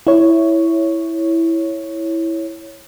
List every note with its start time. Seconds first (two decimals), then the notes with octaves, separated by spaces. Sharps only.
0.07 E4 C#5